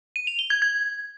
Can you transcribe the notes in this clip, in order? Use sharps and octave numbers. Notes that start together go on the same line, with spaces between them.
D#7
F7
G7
G#6
G#6